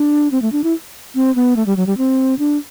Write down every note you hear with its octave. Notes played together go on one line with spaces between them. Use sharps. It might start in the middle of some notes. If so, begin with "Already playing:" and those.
Already playing: D4
C4
A3
D4
E4
C4
B3
A3
G3
F#3
G3
C4
D4